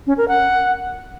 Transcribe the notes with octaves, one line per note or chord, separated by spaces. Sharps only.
C#4
A#4
F#5